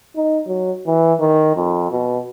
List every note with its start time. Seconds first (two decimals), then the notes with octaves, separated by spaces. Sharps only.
0.16 D#4
0.47 F#3
0.87 E3
1.20 D#3
1.56 F2
1.91 B2